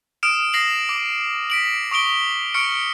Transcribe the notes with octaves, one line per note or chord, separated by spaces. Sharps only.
D#6 F6 D7 E7
D#6 A#6 C7 F#7
D6
B6 D7 F#7
C#6 D#6 D7 G7
C#6 F6 C#7 D7